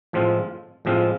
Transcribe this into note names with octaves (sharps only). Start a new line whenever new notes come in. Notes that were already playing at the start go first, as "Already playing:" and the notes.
A2 F3 G#3 C4 F4
A2 F3 G#3 C4 F4